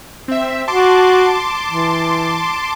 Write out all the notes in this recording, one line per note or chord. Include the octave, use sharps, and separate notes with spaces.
C4 E5
F#4 A5 C6 D6
E3